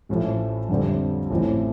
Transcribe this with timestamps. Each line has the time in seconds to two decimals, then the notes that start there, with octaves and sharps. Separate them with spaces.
0.09 A1 A2 F3
0.69 F2 D3 G3 C4
1.30 A1 A2 F3 C4 E4